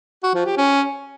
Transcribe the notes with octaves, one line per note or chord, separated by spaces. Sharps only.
F#4
F3
G4
C#4